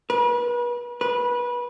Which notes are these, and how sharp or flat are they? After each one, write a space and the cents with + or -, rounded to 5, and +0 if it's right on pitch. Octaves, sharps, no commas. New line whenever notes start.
B4 -35
B4 -25